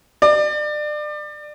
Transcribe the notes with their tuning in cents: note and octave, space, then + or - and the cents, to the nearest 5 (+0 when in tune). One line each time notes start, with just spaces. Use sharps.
D5 +30